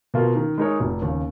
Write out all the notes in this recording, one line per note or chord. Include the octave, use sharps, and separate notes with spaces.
B2 A#3 F4
D#3
G#3 D#4 A#4 C#5
F1
D#2 C#3